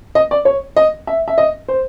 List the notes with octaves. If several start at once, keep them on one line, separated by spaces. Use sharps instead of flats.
D#5
D5
C#5
D#5
E5
E5
D#5
C5